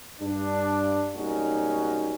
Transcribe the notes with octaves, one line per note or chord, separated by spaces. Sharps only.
G2 D4
B1 G3 A#3 C#4 D#4 F#4